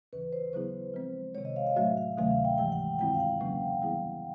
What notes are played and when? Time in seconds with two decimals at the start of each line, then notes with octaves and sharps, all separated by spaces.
0.13 D#2 C#3 E3 B4
0.33 C5
0.53 C#3 F#3 B3 E4 G#4 C5
0.94 F3 G#3 C4
1.35 C3 D#3 G#3 C#5
1.45 D#5
1.56 F5
1.67 F5
1.76 A2 F#3 A3 D4 F#4 E5
1.97 F5
2.18 D2 C3 D#3 F#3 A3 F5
2.31 F5
2.45 G5
2.58 G#2 E3 G#3 G5
2.72 F#5
2.99 G2 D#3 G#3 C4 E4 G5
3.14 F5
3.20 F#5
3.40 E2 C#3 F#3 A#3 C#4
3.81 E3 G3 B3 E4 G#4